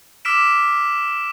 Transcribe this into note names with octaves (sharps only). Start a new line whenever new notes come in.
D6 E6 F6 B6 D7 E7